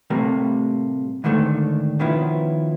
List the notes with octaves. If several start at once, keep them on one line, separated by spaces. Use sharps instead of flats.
A2 C3 G3 A3 A#3
D#2 G#2 D3 D#3 A3 D4
B2 D#3 F3 B3 C#4 E4